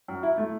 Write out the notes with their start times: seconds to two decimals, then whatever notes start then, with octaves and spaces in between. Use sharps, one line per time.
0.08 F#2
0.23 E4
0.38 A3